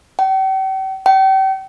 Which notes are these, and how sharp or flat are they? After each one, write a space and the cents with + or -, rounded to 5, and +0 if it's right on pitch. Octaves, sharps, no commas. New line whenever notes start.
G5 -40
G5 -35